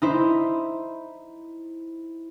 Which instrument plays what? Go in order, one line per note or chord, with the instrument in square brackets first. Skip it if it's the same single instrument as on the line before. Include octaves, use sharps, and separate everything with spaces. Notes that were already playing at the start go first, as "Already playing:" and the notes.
[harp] D#4 E4 C5